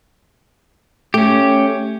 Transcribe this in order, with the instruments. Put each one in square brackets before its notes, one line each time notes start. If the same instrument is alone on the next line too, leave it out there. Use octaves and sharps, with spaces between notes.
[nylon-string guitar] A3 [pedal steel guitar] C#4 G4